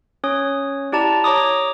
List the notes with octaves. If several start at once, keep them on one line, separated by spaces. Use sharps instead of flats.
C#4 C#5 D#6
E4 G4 D5 A5 A#5
C#5 A#5 D6 D#6